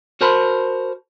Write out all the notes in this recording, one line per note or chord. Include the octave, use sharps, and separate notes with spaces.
F#4 A#4 C5 A5 B5 C6